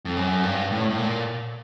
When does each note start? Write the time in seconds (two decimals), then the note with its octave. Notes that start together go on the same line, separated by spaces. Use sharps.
0.05 F2
0.17 F#2
0.43 G2
0.72 A2
0.90 A2
0.98 A#2